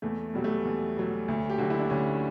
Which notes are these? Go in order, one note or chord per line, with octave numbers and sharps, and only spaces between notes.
E2 A3
B2 F#3 G3
A3
E2
B2 F#3
D2
G4
D3 F#3 F#4
E4
D4
D2 C#4